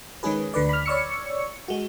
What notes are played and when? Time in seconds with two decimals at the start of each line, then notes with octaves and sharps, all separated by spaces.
0.23 D#3 G#3 C#4 G#4 B4
0.54 D2 D3 B4 D5
0.69 B5 F6
0.86 C#5 D5 C#6 E6 C#7
1.68 G#3 F#4